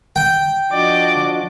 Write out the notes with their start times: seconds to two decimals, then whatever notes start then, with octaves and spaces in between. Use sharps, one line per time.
0.16 G5
0.72 F3 D4 F#4 D5 D#5 D6